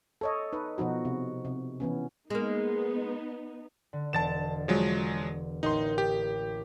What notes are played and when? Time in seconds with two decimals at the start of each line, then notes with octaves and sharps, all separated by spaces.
0.21 A4 C#5 D#5
0.53 D#4 B4
0.78 B2 F3 D#4 F#4
1.05 C3
1.45 C3
1.80 E3 B3 C#4
2.30 G#3 A#3 B3 D#4
3.93 D3
4.13 E1 A5 A6 E7
4.68 F3 F#3 G#3
5.63 A1 A#3 D#4 C6 D#6
5.98 G4